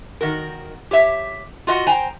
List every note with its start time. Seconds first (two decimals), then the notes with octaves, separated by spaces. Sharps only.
0.21 D#3 F#4 A#4
0.91 G4 C#5 E5
1.67 F4 F#4 D#5 F#5
1.87 C5 G5 G#5 A#5